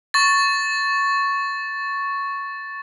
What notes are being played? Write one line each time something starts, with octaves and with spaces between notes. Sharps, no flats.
C#6 A6